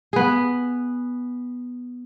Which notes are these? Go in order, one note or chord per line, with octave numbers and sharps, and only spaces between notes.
B3 G#4